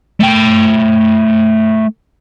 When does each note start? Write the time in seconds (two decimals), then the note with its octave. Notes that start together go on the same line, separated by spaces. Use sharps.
0.21 A3 G5